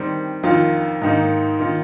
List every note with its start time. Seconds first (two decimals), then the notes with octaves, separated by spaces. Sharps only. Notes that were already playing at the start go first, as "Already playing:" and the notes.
Already playing: D#3 G3 C4
0.43 F2 D#3 A#3 F4
1.02 G#2 D#3 A#3 D#4
1.59 D#3 A#3 F4